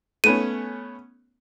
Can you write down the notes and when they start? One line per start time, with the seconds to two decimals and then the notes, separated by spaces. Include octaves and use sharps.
0.24 A3 B3 C#4 D#7